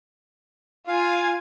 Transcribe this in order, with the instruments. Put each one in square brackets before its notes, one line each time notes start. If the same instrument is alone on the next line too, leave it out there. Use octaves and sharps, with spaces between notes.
[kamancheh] F4 G#5 [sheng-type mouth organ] F5